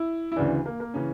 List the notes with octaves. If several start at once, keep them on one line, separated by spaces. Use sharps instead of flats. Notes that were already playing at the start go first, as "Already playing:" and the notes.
Already playing: E4
E4
D2 C#3 E3 D4
A#3
A#3
C#3 E3 C#4